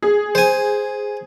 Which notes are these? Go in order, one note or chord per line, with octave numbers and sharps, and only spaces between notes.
G#4
C5 G#5